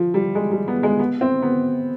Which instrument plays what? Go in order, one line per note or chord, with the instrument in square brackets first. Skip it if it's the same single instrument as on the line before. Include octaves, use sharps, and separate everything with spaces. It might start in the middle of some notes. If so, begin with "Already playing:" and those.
Already playing: [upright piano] F3
G3
G#3
G3
B3
G#3
B3
C4
B3